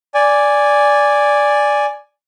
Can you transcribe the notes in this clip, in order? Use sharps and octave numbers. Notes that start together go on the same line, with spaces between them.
D5 G#5